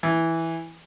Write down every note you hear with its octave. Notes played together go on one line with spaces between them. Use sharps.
E3